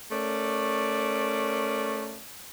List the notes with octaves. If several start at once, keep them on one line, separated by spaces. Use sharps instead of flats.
A3 C#4 A#4 D5